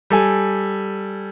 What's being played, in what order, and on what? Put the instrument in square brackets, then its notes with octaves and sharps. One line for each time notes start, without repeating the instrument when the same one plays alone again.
[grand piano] G3 A4 G#5